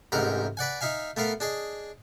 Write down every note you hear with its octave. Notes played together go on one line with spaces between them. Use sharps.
A1 G#2 C3 A#4 F#5 A#5
B4 D5 F#5 G#5
D#4 E5 F5 G#5
A3 B3 A#4 F5
D4 G#4 D#5